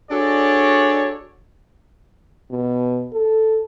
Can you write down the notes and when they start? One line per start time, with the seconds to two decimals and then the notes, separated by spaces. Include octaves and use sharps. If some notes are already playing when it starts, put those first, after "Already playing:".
0.11 D4 F#4 G#4 A4 C#5 D5
2.51 B2
3.12 A4